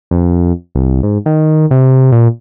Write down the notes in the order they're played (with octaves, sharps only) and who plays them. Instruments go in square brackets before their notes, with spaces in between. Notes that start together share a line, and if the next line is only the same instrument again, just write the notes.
[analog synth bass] F2
C2
G#2
D#3
C3
A#2